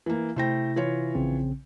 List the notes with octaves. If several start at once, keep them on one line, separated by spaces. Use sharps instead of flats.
E3 A#3
C3 A3 E4 C5 G5 A#6
E3 F4 C#5
A#1 C#3 C4